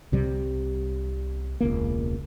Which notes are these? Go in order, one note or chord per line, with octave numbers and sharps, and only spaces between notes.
C2 C3 G3
E1 C#2 A#3